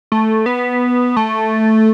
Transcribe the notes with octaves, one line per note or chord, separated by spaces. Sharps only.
A3
B3
A3